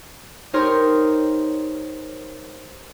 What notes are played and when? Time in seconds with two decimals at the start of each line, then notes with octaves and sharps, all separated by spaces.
0.53 D#4 G4 A#4 C5 C#5 C6